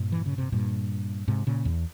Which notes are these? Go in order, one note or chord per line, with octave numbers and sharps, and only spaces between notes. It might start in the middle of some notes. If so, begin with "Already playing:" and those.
Already playing: G2 A#2
E3
C#3
C3
G2 A#2
G#2 C3
A#2 C#3
E2